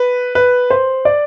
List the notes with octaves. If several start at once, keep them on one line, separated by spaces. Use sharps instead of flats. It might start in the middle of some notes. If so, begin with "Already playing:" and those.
Already playing: B4
B4
C5
D5